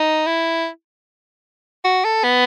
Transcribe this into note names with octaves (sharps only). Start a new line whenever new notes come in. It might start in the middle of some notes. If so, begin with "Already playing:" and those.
Already playing: D#4
E4
F#4
A4
B3